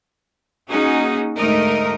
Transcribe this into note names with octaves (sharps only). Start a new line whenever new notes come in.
A#3 C#4 D#4 F#4 G#4
D2 G#2 A3 D#4 A#4 D#5